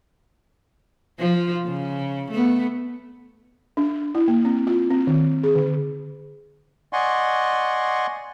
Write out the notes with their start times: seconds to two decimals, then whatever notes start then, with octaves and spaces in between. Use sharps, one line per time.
1.19 F3 F4
1.66 C#3
2.31 A3 B3
3.77 D4
4.15 E4
4.28 A#3
4.45 C4
4.67 F4
4.91 C4
5.07 D#3
5.43 G#4
5.55 D3
6.93 D5 D#5 F#5 G#5 C6 C#6